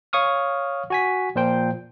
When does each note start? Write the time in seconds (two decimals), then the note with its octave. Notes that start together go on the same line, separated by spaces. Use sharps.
0.13 C#5 F5 C#6 D#6 F6
0.90 F#4 G#5 B6
1.36 A#2 F3 C5 G5